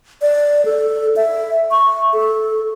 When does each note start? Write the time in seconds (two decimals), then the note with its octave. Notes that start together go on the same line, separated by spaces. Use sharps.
0.22 D5
0.65 A4
1.16 E5
1.71 C#6
2.13 A4